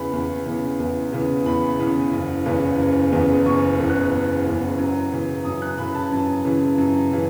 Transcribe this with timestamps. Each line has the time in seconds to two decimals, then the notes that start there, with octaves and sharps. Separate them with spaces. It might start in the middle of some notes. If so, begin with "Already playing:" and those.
Already playing: E2 C#3 E3 B3 B5
0.13 E2
0.46 C#3 E3 B3
0.80 E2
1.13 C#3 E3 B3
1.46 E2 B5
1.80 C#3 E3 B3
2.13 F#1
2.46 E2 C#3 E3 B3
2.79 F#1
3.12 E2 C#3 E3 B3
3.45 F#1 C#6
3.78 E2 C#3 E3 B3
3.90 F#6
4.12 F#1
4.45 E2 C#3 E3 B3
4.79 F#2
5.12 C#3 E3
5.45 F#2 D#6
5.62 F#6
5.78 C#3 E3 B5
5.95 A5
6.12 F#2
6.45 C#3 E3
6.78 F#2
7.11 C#3 E3